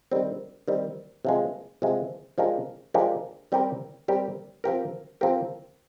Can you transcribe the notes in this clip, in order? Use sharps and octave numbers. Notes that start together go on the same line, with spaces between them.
D#3 G3 C4
D#3 G3 C4
C3 F3 G#3
C3 F3 G#3
F3 G#3 D4 G4 A#4
F3 G#3 D4 G4 A#4
G3 C4 G4 A#4
G3 C4 G4 A#4
F3 C4 G4 A#4
F3 C4 G4 A#4